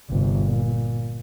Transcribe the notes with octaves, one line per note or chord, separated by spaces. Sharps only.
G1 C3
A#2